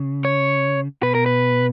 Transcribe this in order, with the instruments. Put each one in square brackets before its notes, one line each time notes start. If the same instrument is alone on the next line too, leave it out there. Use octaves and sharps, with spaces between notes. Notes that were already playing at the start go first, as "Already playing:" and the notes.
Already playing: [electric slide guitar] C#3
[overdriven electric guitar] C#5
[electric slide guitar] B2 [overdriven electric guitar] B4
[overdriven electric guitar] A#4
B4